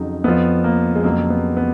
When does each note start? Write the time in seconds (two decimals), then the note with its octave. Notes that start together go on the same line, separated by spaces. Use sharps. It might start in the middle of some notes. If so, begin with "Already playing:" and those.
Already playing: F2 C#3 F#3 D#4
0.24 F2 F3 B3
0.64 A#3
0.95 G#3
1.04 F2 C#3 F#3 A#3
1.30 B3
1.57 B3